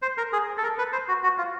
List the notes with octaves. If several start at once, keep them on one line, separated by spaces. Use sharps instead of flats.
C5
A#4
G#4
A4
A#4
B4
C5
F#4
F#4
F4